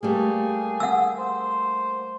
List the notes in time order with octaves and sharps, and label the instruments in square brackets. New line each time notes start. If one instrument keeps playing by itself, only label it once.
[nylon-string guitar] G3 A3 A#3 [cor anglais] G#4
[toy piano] F#5 E6
[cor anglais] C5